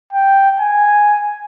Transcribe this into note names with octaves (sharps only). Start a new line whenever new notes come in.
G5
G#5